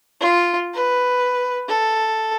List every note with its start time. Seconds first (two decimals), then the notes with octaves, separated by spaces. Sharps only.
0.21 F4
0.74 B4
1.69 A4